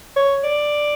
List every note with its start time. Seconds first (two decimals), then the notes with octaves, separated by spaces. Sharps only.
0.17 C#5
0.44 D5